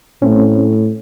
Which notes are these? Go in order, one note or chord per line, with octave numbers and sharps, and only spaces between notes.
A2 A3 C4 C#4